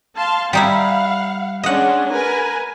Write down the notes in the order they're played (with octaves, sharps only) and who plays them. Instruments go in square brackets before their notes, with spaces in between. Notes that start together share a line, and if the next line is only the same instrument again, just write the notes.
[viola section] F5 A5 C6
[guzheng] G3 D#4 E4 [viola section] F5 F#5
[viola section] G#3 C#4 D4 [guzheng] D#5 F#5
[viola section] A#4 B4 G#5